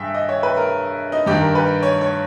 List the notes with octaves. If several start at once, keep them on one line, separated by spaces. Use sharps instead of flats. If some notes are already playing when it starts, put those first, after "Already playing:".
Already playing: G2 G#4 E5 G5
D#5
C#5
B4
A#4
D#4
G2 D#3 G4
A#4
B4
C#5
C#5